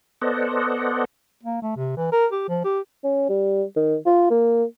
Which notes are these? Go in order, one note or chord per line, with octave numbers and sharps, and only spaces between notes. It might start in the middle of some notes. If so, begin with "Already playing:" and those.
B3 A4 C5 D5 D#5 F#5
A#3
A3
C3
E3
A#4
G4
F3
G4
C#4
G3
D#3
F4
A#3